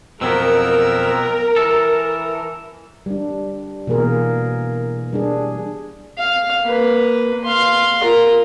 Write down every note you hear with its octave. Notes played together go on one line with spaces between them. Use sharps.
F2 B2 F#3 B3 C4 A#4 E6
E3 A4
G3 D4
B2 E3 A#3 G#4 A#4
G3 D4 G#4
F5
A#3 B4
F5 C6
F4 A#4